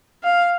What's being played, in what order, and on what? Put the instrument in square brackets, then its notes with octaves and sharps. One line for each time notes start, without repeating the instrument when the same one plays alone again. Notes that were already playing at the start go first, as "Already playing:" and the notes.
[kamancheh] F5